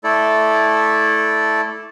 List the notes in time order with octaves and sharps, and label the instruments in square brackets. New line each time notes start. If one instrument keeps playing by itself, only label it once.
[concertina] A3 E4 A4 D5